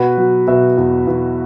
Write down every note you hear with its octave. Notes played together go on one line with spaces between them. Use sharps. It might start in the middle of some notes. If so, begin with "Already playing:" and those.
Already playing: B2 F#4 B4
F#3
B2 B4 E5
E2
E2